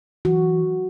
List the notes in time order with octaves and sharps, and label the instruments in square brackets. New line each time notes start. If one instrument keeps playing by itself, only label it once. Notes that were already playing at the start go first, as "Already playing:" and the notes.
[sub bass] E3 [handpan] F#4